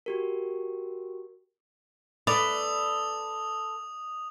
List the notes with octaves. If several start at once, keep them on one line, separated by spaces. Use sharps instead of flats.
F#4 G4 A#4
A4 B4 D5 D#6 F7